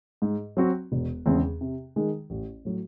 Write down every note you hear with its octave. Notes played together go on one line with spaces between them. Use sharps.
G#2
F#3 C4 F#4
E1
E2 C#3 G#3 C4
C3
D#3 G#3 D#4 G#4
A1
A2 F#3